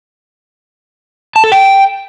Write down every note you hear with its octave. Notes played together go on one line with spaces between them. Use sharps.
A5
A4
G5